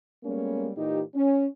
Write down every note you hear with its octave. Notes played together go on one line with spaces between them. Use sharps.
G3 G#3 A#3 B3 C#4
A#2 E3 D#4 G4
C#4